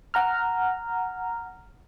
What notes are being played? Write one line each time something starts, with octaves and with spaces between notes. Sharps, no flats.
F#5 A#5 F6